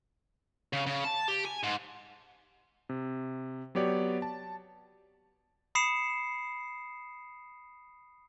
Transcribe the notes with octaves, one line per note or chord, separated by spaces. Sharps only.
C#3
C#3
A5
G4
G#5
G#2
C3
F#3 B3 G4 C#5 D5
A5
B5 D#6 C7 C#7 E7